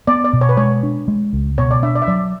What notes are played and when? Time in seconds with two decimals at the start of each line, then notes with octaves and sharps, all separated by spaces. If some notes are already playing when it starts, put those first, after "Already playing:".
0.07 B3 D5
0.24 D5
0.33 B2
0.41 C#5
0.49 B4
0.57 G#3 C#5
0.83 D4
1.08 G#3
1.33 C#2
1.58 B2 C#5
1.71 D5
1.83 D4 E5
1.95 D5
2.02 E5
2.08 F#3 D5